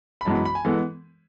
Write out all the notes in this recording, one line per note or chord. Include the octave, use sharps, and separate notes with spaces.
B5
F#2 E3 G#3 B3 A5
B5
B5
G#5
E3 G#3 B3 A4